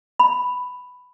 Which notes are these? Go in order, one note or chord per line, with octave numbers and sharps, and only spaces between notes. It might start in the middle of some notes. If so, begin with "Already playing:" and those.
B5